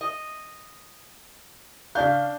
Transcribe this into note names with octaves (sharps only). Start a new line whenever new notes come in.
D#5
C#3 D4 F5 G6